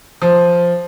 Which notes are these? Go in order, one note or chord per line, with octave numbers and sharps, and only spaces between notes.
F3